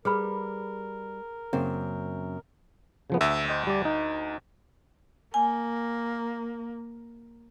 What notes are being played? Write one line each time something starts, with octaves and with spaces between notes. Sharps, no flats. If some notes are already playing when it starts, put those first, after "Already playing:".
G3 G#4 A#4 B4 B5
F#2 C#3 A#3 C4
C#3 F3 B3
D2 E5
C5 D#5 G5
G3 D5
D#4
A#3 G#5